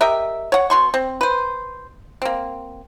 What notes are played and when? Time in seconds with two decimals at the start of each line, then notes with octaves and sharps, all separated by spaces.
0.01 G4 A#4 D#5 E5
0.52 C#5 F#5
0.70 B2 C6 C#6
0.94 C4
1.21 B4 C5
2.22 A#3 C4